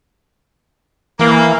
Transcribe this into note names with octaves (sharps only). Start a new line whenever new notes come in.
E3 A#3